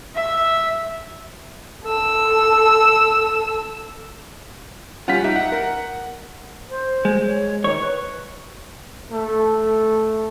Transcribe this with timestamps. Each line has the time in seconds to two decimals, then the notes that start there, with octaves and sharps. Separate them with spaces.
0.15 E5
1.84 A4 E6
5.08 G3 C#4 F4 F#5 B6
5.24 D#4 G4 E5
5.36 F#5
5.52 A#4
6.70 C5
7.05 G#3
7.26 C#5
7.64 D#3 C#5
7.81 B4
9.12 A3